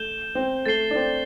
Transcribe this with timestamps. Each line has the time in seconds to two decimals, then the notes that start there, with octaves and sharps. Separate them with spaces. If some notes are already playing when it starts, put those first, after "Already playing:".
Already playing: A3 G6 E7 G7
0.35 C4
0.66 A3 A6 C7 G7
0.91 D4
0.95 C4